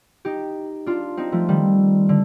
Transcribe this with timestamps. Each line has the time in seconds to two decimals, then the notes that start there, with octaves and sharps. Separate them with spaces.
0.25 D#4 G4
0.86 D4 F4
1.17 C4 D#4
1.32 F3 A3
1.48 D#3 G3
2.09 D3